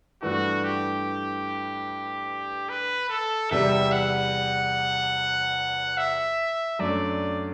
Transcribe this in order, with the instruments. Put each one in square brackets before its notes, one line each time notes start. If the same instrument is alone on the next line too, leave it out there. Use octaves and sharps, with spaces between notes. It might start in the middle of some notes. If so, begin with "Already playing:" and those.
[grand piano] G2 E3 A3 D4 [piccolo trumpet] F#4
[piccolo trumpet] G4
B4
A4
[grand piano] E2 C3 G3 [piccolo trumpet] E5
[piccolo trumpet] F#5
E5
[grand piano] F#2 F#3 A3 D4 [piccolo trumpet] D5